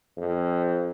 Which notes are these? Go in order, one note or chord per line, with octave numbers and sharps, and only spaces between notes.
F2